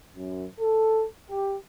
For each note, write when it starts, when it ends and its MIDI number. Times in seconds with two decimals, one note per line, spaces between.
0.16 0.45 42
0.59 1.05 69
1.29 1.56 67